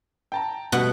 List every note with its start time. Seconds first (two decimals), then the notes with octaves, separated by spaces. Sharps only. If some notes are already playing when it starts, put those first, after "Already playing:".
0.32 G5 A5 A#5
0.72 B2 G3 A3 F#5